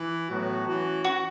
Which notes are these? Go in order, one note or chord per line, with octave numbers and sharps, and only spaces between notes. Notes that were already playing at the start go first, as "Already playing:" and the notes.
Already playing: E3
A2 F#3 B3 F#4
E3 C#4 F#4
F#4